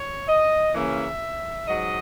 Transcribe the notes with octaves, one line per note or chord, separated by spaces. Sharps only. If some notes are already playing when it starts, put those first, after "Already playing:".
Already playing: C#5
D#5
C#3 E3 A#3 C#4 E5
G#2 F#3 D#5